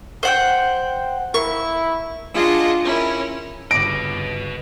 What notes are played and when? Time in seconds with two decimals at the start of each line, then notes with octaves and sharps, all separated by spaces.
0.23 C5 F#5 G5
1.34 E4 A#4 C#6
2.35 D4 F4 G#4 D#5 F#5
2.85 C#4 E4 A#4
3.71 G1 C#3 B4 D#5 D6 A#6 D7